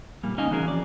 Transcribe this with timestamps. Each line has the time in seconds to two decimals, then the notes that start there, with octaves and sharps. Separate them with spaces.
0.23 A#2 G3 A#3
0.37 D#2 C#4 D#4 D#5 F5 G#5
0.51 E3 C#4 F#4 G#4 A#4
0.68 F2 D5